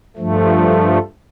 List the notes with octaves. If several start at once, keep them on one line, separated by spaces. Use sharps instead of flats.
G2 F3 A3